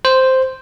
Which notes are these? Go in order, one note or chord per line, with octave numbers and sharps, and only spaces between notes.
C5